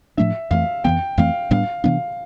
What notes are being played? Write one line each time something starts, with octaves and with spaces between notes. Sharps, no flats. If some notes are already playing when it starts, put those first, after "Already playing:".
A2 F3 A3 D4 E5
F2 E3 A3 F5
F2 E3 B3 G5
F2 E3 A3 C4 F5
A2 G3 B3 D4 F5
C3 E3 B3 D4 F5